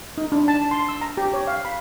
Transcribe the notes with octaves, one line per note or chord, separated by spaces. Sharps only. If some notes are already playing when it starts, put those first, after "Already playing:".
D#4
D4
A5
C6
E6
A#5
G4
C#5
F5
B5